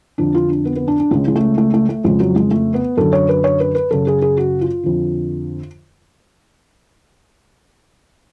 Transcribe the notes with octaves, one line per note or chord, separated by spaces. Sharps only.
F2 D3 D4
F4
D4
B3
B3
D4
D4
C#2 C#3 G#3
G#3
A3
A3
A3
A3
F2 C#3 G#3
F#3
G#3
A3
B3
F#2 D3 A4
C#5
B4
C#5
B4
B4
F#2 C#3 A4
G#4
G#4
F#4
F4
F2 D3